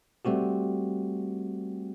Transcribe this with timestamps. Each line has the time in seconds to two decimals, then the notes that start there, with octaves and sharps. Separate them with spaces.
0.25 G3 A3 C4 F#4 G4